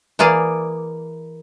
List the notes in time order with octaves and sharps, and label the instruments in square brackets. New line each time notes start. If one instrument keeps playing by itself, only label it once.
[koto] E3 A#3 G#4 D5